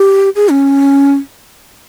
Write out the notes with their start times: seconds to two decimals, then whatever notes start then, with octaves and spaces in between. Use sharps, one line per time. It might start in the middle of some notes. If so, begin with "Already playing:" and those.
Already playing: G4
0.36 G#4
0.49 C#4